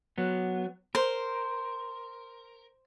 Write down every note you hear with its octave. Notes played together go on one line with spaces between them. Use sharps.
F#3 B3
A#4 C5